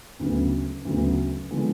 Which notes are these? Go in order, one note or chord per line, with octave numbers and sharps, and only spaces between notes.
D2 C#3 F#3 B3
D2 C#3 F#3 B3
D3 F3 G#3 B3